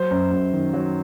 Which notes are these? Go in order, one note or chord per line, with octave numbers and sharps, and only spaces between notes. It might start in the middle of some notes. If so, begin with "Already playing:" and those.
Already playing: F#3 C5
F#2
F#2
D#3
F#3